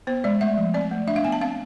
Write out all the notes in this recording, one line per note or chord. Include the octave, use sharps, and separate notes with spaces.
B3 C5
G#3 D5
A3 E5
F3
C4 D5
A3
D4 E5
F5
B3 G#5
A5
C4 F5